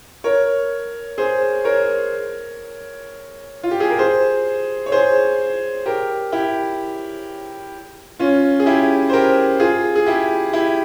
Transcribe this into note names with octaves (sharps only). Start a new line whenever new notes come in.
A#4 C#5
G#4 C5
A#4 C#5
F4
G4
G#4
A#4
G#4 C5
C#5
G#4 C5
G4 A#4
E4 G4
C#4 F4
G#4
E4 G4
C5
G4 A#4
F4 G#4
G#4
E4 G4
E4 G4